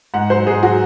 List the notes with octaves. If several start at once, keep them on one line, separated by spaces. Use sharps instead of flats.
G#2 F#5
F#3 C5
G#2 G#4
F#3 F#4